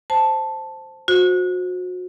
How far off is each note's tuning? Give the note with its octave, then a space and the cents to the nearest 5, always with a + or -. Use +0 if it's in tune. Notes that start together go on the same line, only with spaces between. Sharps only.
C5 +0 A5 +0
F#4 -30 C5 +0